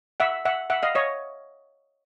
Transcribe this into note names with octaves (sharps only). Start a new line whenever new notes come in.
E5 F#5
E5 F#5
E5 F#5
D#5 F5
C#5 D#5